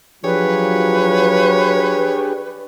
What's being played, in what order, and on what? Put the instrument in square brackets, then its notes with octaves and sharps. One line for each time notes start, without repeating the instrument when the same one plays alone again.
[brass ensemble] F3 F#3 [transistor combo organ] D4 G4 G#4 [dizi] B4 [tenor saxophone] C#5